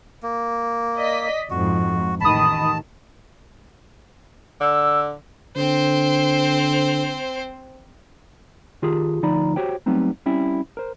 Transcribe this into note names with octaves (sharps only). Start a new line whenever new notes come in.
A#3
D5 D#5 B6
F2 G#2 F#4
A1 D#3 A5 B5 D#6
D3 E6
D3 C4 C5
D#3 F4 G4 G#4
D2 F3 D#4 D5 A#5 B5
F#4 G4 C5 C#5 G5
F#3 G3 A3 B3 C4 D#4
G3 C4 C#4 E4 G5
A#4 C5